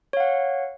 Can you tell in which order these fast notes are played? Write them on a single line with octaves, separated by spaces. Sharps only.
C#5 F5 F#5